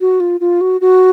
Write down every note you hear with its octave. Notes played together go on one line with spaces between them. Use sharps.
F#4
F4
F4
F#4
F#4